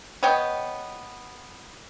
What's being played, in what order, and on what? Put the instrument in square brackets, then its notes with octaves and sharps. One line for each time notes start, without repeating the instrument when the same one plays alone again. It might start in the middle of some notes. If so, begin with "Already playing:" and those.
[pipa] B3 C#5 D#5 G5